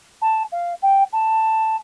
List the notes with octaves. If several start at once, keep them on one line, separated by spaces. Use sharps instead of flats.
A5
F5
G5
A5